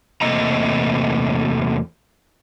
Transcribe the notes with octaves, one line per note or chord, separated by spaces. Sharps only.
E2 C3 A3 A#3 D#5 A#5